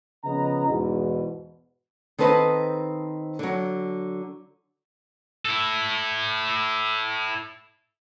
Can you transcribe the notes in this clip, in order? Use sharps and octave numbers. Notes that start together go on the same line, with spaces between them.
C#3 F3 B3 D#5 A#5
E2 G#2 B2
D#3 C4 A4 B4 C5 D#5
D3 F#3
E4 A4